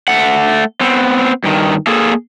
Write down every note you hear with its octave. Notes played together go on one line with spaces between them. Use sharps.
A3 F#5
B3 C4
G2 D#3
A#3 G#4 A4